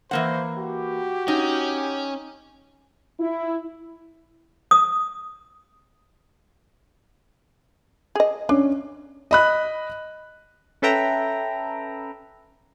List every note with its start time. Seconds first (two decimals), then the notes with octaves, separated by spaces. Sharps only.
0.11 E3 A#3 C5 F#5
0.58 F#4 G4
1.28 C#4 D#4
3.20 E4
4.71 D#6
8.15 G#4 D#5
8.49 C#4 D4
9.31 D#5 B5 F#6
10.82 C#4 A4 B4 E5 G5 A#5